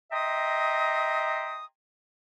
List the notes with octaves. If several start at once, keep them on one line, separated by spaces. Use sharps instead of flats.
D#5 E5 G5 A#5 C6 D#6